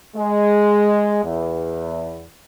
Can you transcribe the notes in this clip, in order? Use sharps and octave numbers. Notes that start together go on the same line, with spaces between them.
G#3
E2